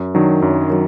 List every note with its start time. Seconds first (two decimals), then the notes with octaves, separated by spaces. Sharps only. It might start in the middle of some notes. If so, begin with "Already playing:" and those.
Already playing: F#2
0.15 D#3 F#3 D4
0.42 F#2
0.70 D#3 F#3